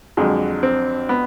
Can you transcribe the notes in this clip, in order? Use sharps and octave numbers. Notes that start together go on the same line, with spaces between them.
F2 D3 F#3 G#3
C4
B3